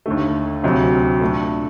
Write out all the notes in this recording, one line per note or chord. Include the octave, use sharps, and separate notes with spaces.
D#2 D3 A3
D2 C3 F#3 C4
A#2 A3 D4